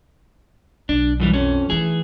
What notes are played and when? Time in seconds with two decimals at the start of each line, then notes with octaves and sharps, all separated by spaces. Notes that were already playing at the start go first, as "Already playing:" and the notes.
0.89 B1 D4
1.20 F#2 E3 G3
1.33 F2 C#4
1.70 E3 A3 D#4 G#4